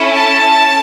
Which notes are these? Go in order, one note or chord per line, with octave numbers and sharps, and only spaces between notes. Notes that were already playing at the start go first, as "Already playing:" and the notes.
Already playing: C#4 E4 A4
A5